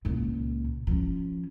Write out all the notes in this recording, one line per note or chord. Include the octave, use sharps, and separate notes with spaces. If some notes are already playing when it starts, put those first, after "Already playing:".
C#2 A#2
F3 C#4